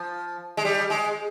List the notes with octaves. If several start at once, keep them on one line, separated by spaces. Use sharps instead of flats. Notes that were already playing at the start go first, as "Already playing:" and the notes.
Already playing: F3
G#3
G3
G#3